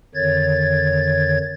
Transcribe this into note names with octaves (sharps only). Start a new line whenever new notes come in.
F2 D3 D#3 C#5 G#6 A6